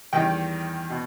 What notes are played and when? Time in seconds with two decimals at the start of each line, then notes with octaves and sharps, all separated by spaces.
0.13 E2 D#3 G3 D#4 G5
0.90 B2